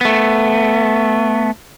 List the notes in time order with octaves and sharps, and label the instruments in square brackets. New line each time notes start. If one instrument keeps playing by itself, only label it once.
[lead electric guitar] A3 B3